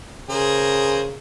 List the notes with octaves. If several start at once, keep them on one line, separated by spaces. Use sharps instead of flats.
C#3 G#4 A#4 C5